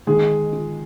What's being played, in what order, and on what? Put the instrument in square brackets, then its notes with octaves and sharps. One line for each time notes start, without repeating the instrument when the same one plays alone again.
[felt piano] D#3 [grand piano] G#3 G#4
[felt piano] F4